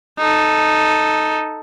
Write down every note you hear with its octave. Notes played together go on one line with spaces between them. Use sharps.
D#4 A4